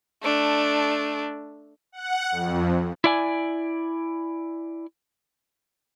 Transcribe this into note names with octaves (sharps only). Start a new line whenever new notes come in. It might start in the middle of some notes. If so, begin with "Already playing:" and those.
A3 D4
F#5
F2
E4 D5 G#5